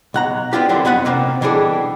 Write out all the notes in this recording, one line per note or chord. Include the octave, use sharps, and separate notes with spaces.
B1 F#5 A#5
B3 C4 D4 E4 F4 G4
D3 E3 F#3 G3 A#3 C4
F2 B3 D#4 F#5 B5
C3 A#3 C4 C#4
B2 E3 G3 D4 G#4 A4